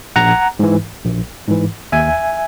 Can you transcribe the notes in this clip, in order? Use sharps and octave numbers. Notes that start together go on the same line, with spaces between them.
A#1 F#5 A#5
G#2 E3
A#1
G#2 E3
D#2 E5 G#5